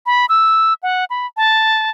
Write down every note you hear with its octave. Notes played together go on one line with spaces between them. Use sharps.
B5
E6
F#5
B5
A5